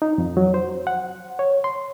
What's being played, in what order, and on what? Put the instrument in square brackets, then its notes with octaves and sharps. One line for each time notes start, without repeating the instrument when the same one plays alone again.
[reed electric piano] D#4
F2
F#3
C5
F#5
C#5
C6